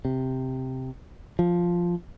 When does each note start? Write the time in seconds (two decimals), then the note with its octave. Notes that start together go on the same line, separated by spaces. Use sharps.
0.05 C3
1.39 F3